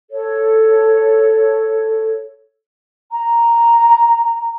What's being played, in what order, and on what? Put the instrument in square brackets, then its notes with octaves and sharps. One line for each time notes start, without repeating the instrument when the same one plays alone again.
[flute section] A4 C#5
[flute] A#5